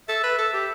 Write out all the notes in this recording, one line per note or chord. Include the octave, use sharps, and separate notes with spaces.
A4 E5
B4
A4
G4